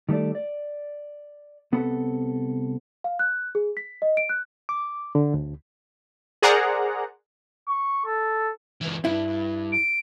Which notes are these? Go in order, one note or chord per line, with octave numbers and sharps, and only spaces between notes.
D#3 G3 A3 A4 D5
D5
C2 B3 C4 A4 F#5 B5
F5
F#6
G#4
B6
D#5
D7
F#6
D6
D3
D2
G#4 A#4 C5 D5 F#5 A#5
C#6
A4
C#2 E3
G2 E4
D7